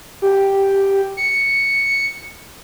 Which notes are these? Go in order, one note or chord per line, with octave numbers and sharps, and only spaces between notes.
G4
C#7